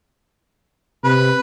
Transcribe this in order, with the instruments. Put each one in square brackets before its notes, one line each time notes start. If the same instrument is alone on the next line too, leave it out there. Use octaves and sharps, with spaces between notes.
[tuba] C3 [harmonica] B4